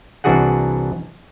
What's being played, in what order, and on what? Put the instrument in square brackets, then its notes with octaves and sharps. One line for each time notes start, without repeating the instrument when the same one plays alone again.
[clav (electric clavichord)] C2 E3 D4 F#4 G#4 F#5